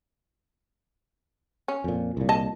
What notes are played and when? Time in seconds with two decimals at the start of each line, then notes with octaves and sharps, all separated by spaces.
1.68 C#4
1.84 F2 A#2
2.17 C2 A#2
2.29 D#5 A5